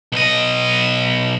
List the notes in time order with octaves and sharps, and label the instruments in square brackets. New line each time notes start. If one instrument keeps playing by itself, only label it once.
[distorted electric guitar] B1 D#5